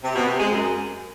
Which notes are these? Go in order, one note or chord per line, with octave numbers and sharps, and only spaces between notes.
C3
B2
C3
G#3
F#2